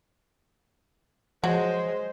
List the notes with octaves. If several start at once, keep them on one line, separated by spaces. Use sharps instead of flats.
F3 F#3 G#3 C5